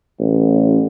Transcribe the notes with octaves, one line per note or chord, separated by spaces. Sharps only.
A1